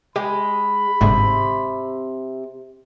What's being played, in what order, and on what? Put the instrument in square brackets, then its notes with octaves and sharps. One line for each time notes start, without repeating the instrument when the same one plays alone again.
[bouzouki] G#3 [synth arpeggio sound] G4 [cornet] B5
[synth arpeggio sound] G1 G#2 [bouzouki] C3